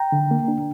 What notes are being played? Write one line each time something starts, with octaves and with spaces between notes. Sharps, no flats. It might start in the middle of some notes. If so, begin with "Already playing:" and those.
Already playing: G5 A#5
D3
A#3
D4